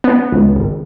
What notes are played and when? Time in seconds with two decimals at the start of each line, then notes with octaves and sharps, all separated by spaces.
0.04 B3
0.32 C#2
0.56 G#1